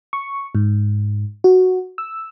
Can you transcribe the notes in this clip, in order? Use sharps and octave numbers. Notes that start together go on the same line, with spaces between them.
C#6
G#2
F#4
E6